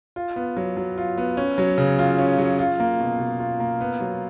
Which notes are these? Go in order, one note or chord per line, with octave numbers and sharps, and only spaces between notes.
F4
B3
F#3
F#3
F4
B3
C#4
F#3
C#3
F4
C#4
F#3
F4
A#3
B2
B2
F4
A#3
B3
F#3